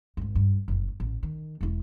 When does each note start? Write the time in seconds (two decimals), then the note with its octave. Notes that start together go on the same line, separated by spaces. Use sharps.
0.17 D#1 G#1
0.35 G2
0.68 F#1 F2
1.00 A1
1.23 D#3
1.61 E1 E4